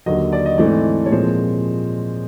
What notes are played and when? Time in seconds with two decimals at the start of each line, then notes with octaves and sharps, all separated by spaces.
0.06 D#2 D3 F#3 D#5
0.33 D5
0.46 D#5
0.58 G#2 E3 A3 C4 D5
1.06 C#5
1.11 A#2 F3 G#3 C4 C5